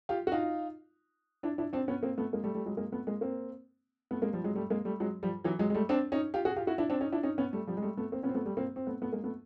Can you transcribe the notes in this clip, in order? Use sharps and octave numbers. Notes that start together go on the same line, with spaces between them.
F4 G4
F#4
D#4 F4
D4 E4
D4 E4
C4 D4
B3 C#4
A#3 C4
A3 B3
G#3 A#3
G3 A3
G3 A3
F#3 G#3
G#3 A#3
A3 B3
G#3 A#3
A#3 C4
A3 B3
G#3 A#3
F3 G3
F#3 G#3
G3 A3
G#3 A#3
G3 A3
F#3 G#3
F3 G3
E3 F#3
F#3 G#3
G#3
G3 A3
C4 D4
C#4 D#4
F4 G4
F#4 G#4
F4 G4
E4 F#4
D4 E4
C4 D4
C#4 D#4
D4 E4
C#4 D#4
B3 C#4
G3 A3
F3 G3
G#3
G3 A3
A3 B3
A#3 C4
B3 C#4
C4
A3 B3
G3 A3
A#3 C4
C4
A3 B3
A3 B3
G#3 A#3
A3 B3